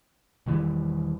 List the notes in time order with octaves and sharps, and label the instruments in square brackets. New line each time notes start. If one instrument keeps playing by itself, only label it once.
[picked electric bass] E1 D#3 E3 G3